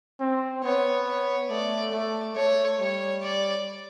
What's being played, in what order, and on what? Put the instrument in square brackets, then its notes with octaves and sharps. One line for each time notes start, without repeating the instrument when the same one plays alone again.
[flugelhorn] C4
[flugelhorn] B3 [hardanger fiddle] C#5
[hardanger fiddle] C#5
[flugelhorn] A3 [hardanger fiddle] D5
[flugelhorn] A3 [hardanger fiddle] D5
[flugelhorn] A3 [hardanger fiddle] C#5
[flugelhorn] G3 [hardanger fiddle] C#5
[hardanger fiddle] D5